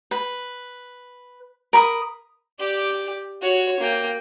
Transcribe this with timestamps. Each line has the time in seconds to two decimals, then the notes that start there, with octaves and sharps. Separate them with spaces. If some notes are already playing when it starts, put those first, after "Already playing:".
0.11 B4
1.73 A#4 B5 D#6
2.59 G4 D5
3.42 F#4 C#5
3.80 A#3 G5